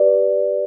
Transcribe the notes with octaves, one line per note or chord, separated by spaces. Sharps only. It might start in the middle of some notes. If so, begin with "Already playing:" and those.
Already playing: G4 B4 D5